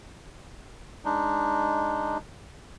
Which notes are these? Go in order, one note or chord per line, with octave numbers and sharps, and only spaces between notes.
G#3 D4 D#4